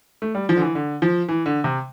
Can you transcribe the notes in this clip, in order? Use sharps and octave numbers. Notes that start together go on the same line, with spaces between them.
A3
G3
F3
D3
E3
D3
F3
E3
D3
C3